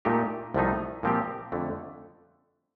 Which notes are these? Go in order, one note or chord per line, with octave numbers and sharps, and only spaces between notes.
A#2 A3 D#4 G4
C2 C3 F3 A3 D#4
A#2 F3 C4 G4
F2 D3 A3